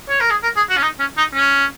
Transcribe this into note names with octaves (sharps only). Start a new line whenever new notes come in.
C#5
A#4
G#4
A#4
G#4
F#4
C#4
D#4
C#4
D#4
C#4